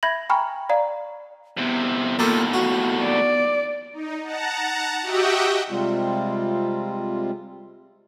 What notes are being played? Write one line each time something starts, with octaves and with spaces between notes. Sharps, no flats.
E5 B5 G6 G#6 A#6 F#7
G5 G#5 A#5 B5 C#6 F6
D5 F5 A#5
E2 C3 B3
D#2 A2 A#3 F4 A4
F#4
D5
D#4
F#5 A5 A#5
F#4 G4 D#5 E5 F#5 G5
C3 G3 G#3 C4 F4